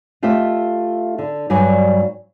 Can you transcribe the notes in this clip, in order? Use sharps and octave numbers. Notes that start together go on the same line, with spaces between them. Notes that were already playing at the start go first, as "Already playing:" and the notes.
A3 F4 G4 D#5 E5
D3
G2 F#3 D5 G#5